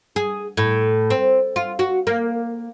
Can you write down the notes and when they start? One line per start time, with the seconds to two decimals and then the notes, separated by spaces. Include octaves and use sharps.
0.16 G#4
0.57 A2
1.10 C4
1.56 F4
1.79 F#4
2.07 A#3